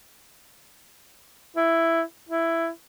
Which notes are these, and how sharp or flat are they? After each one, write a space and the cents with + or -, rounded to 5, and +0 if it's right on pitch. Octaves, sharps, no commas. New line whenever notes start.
E4 +5
E4 +10